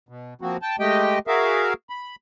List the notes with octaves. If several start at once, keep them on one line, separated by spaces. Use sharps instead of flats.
B2
F3 A#3 C4 F#4
G5 A5
G#3 A3 G4 D#5 G5
F#4 G#4 A#4 E5 F5
B5